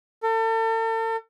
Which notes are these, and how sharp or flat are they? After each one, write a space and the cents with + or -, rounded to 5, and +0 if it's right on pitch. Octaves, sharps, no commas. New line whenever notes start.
A4 +40